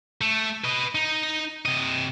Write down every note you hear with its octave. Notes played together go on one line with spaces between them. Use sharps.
A3
B4 D#5
D#4
C3 D#5